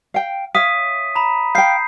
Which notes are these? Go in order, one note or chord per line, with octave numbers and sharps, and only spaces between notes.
F5 G5
C#5 E5 F5 D#6 B6 D#7
A#5 B5
F5 G5 G6 C7